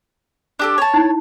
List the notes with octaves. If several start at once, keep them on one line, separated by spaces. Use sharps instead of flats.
D4 G4 A4
C#5 A5
D#4 E4